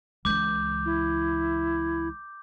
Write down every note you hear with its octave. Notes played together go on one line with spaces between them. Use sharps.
C#2 E3 D6 G6
E4